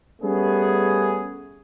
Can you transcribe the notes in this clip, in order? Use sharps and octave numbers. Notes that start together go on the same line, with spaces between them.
G3 A3 B3 C#4 G#4